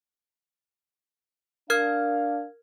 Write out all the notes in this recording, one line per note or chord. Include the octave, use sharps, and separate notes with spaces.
D4 A#4 F5 F6 G#6